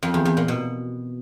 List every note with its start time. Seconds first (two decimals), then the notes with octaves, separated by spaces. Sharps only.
0.03 F2
0.14 E2
0.25 E2
0.37 A#2
0.48 B2